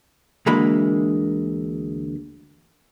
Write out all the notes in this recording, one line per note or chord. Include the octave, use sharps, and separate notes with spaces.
D2 D3 E3 G#3 A#3 B5